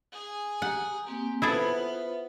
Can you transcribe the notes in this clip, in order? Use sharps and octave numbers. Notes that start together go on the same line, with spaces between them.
G#4 G#5
G4 F#5 A#5
A#3 C4 G4 G#5
B3 E4 F4 G#4 A4 B4 C5 E5